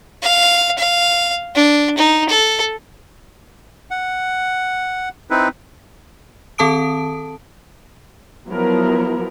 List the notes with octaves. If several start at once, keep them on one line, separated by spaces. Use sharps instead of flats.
F5
F5
D4
D#4
A4
F#5
C4 D#4 E4 B4
D#3 C4 A4 A5 D#6 D7
F3 F#3 B3 E4 A#4